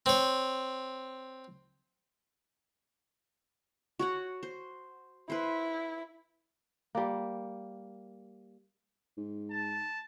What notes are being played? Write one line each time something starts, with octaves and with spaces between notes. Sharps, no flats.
C4 C#5
F#4 C#5 F#5
C5
E4 B4 C5
G3 A#3
G#2
A5